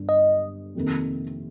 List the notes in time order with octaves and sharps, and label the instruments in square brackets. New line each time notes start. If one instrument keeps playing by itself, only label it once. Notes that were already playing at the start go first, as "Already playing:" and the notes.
Already playing: [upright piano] G1 G2
[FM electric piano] D#5
[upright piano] F2 C3 D#3 A#3